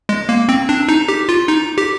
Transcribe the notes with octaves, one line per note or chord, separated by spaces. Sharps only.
G#3
A#3
C4
D4
D#4
G4
F4
D#4
G4